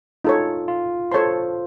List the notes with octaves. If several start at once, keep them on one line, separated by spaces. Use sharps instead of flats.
D#4 F4 A4 C#5
F4
A4 C5 C#5 A5 C6